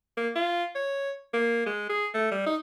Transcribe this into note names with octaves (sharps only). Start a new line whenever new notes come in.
A#3
F4
C#5
A#3
G#3
G#4
A3
G3
D#4